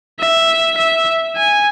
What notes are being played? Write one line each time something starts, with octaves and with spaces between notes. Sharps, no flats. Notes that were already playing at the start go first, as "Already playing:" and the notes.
E5
E5
G#5